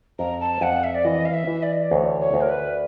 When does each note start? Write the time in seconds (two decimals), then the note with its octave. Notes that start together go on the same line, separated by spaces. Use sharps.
0.19 F2 A#5
0.40 A5
0.61 F2 F#5
0.83 E5
0.94 D5
1.05 E3 D#5
1.25 F5
1.33 E5
1.47 E3
1.63 D5
1.72 D#5
1.81 D5
1.91 D2 C#5
2.20 C#5
2.34 D2
2.41 A#4
2.49 B4